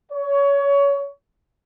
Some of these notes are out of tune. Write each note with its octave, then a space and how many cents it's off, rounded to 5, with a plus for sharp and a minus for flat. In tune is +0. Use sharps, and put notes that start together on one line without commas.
C#5 +25